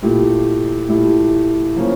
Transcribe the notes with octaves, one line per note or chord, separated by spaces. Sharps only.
A#2 A3 E4 G4
A#2 A3 E4 G4
C#3 F3 A#3 C#4